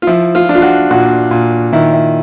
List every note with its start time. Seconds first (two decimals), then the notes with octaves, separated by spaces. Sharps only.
0.02 F4
0.07 F3 E4
0.35 F4
0.49 D4
0.55 F4
0.62 F#4
0.91 A#2 F#4
1.31 A#2
1.73 D#3 E4
1.93 E4